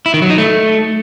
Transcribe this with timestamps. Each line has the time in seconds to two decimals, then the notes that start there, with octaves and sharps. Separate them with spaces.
0.06 E4
0.14 D#3
0.22 F#3
0.30 D#4
0.38 A3